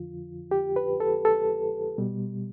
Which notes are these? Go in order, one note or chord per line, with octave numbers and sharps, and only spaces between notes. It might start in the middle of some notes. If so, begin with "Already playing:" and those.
Already playing: F2 D3 F3 F4
G4
B4
A4
A4
B2 G3